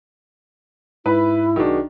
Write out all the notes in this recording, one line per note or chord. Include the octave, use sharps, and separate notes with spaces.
G#2 E4 B4 B5
B1 D#3 D4 F#4 G#4